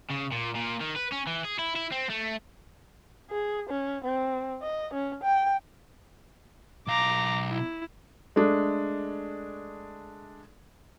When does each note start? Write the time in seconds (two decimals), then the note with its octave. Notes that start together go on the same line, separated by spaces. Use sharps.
0.11 C#3
0.32 A#2
0.56 A#2
0.81 D#3
0.96 B4
1.12 C#4
1.27 E3
1.45 G#4
1.59 E4
1.76 E4
1.91 C4
2.10 A3
3.31 G#4
3.69 C#4
4.04 C4
4.62 D#5
4.94 C#4
5.23 G5
6.87 B1 F5 A#5 D6
7.51 E4
8.36 G#3 A3 D4